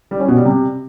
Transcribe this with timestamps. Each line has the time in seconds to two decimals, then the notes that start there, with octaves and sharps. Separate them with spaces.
0.11 G3
0.20 C#4
0.28 B2
0.37 G3
0.45 C3